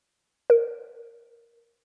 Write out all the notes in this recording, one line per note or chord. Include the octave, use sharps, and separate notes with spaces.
A#4